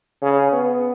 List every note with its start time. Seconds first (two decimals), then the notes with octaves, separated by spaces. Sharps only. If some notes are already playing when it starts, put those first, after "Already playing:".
0.22 C#3
0.53 B3